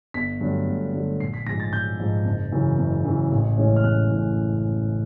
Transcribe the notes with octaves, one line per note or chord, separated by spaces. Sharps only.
G1 B6
G2 D3 F#3 A3
G1
G2 D3 F#3 A3
A#1 C7
B6
G#2 F3 G#3 A#6
A6
A#1 G6
G#2 F3 G#3
F#1
F#2 C#3 E3
F#1
F#2 C#3 E3
A1
A2 E3 G#3 C#4
F6
A1 F#6
A2 E3 G#3 C#4